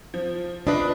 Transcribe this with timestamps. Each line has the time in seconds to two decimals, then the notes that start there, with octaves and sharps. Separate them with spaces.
0.14 F3
0.67 D4 F4 B4 D#5 D#6